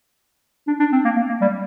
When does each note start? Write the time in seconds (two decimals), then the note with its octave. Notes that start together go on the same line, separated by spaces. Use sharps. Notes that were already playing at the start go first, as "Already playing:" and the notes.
0.67 D4
0.80 D4
0.92 C4
1.05 A#3
1.16 A#3
1.29 A#3
1.41 G3